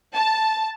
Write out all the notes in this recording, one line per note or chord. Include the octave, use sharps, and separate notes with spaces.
A5